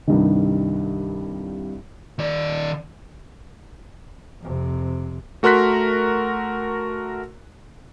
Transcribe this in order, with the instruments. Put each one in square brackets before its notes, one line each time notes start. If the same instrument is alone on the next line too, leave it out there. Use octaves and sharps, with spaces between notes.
[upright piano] C2 G2 D#3
[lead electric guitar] D#3 D5
[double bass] F2 C3
[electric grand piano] A3 F#4 A#4 C6 F#6 B6